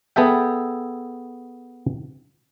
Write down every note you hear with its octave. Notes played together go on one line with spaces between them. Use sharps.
B3 G#4 A4 E5 G5